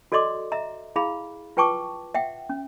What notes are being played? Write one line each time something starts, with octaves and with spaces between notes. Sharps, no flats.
F#4 A4 D5 D#5 C6 D6
D#5 E5 A#5
E4 G#4 F5 B5
F4 B4 G5 A5 C#6 D6
E5 F#5 G5
C#4